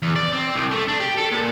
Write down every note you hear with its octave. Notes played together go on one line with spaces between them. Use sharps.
E2
D5
C4
C2
A3
D4
G4
A4
A#2